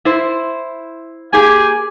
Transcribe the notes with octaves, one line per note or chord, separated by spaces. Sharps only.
E4 C5
A#3 G4 G#4 G#5